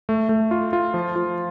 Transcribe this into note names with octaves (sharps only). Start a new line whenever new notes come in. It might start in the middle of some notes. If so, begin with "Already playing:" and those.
A3
A3
F4
F4
F3
F3